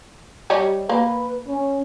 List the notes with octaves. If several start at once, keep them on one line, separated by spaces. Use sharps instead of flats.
G3 C#5 D#5
A#3 B4
C#4